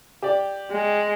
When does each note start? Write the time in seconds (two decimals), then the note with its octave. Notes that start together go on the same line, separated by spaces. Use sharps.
0.22 G4 D5
0.71 G#3